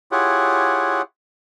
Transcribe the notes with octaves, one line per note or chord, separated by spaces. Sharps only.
E4 F4 G4 G#4 C#5 F#5